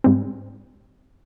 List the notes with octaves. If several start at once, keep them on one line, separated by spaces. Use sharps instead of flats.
G#2 G3 C4